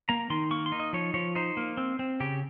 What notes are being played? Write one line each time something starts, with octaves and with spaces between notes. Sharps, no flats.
A#3 A#5
D#3 C6
A#3 C#6
C6
D#4
D#5
F3 C#5
F3 C#5
D#4 C5
A#3
C4
C4
C#3 G4